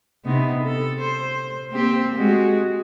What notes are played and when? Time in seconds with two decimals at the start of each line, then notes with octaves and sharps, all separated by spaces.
0.25 C3 B3 D#4
0.64 A4
1.01 C5
1.70 A#3 C4 G4
2.15 G#3 F#4